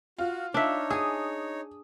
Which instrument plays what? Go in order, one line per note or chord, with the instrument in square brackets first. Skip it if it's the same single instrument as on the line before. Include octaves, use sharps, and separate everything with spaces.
[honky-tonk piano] F4 [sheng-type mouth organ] F#4
[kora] D4 E5 [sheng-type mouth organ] D#4 C#5
[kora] G#4 [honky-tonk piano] D#6